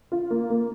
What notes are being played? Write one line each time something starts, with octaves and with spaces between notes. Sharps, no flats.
F4
A#3
A#3